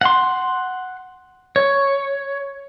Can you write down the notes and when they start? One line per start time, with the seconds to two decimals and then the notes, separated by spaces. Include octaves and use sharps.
0.01 F#5 C6
1.56 C#5